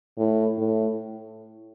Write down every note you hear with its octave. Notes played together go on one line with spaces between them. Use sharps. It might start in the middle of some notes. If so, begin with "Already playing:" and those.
A2
A2